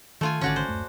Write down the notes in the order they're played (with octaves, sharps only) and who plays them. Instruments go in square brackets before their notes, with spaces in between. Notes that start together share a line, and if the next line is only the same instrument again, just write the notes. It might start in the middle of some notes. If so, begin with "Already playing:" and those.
[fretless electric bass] D#3 [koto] A3 F4 G#5
[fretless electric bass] G#1 D3 D#3 [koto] C#4 F#4 D5
[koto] C5
[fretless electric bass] D1 F#2 A3